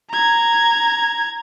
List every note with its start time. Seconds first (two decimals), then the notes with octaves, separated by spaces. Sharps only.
0.10 A#5 G#6